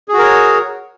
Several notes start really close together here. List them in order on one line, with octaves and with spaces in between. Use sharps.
G#4 F#4 A#4 C#5